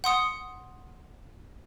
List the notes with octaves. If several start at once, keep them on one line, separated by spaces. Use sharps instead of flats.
F#5 C6 D#6 C#7